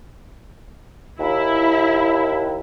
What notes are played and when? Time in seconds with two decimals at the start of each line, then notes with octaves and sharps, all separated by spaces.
1.20 D#2 E4